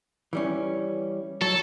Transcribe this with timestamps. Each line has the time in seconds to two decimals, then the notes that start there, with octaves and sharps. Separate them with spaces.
0.33 E3 G3 C#4
1.41 F#3 A4